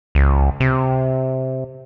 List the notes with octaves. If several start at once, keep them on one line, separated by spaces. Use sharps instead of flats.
C#2
C3